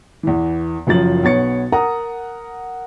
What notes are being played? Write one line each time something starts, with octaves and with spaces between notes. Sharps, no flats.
E2 E3
F#1 F#2 F3 A6 F#7
B1 B3 C#5 A6 C#7
A#4 F#5 A#5 D#6